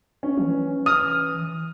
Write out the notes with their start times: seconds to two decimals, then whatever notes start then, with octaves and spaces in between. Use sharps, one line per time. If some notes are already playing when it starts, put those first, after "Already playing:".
0.23 C#4
0.37 E3
0.86 D#6 F6